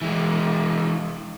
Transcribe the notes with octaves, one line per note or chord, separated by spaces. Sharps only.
E3 G#3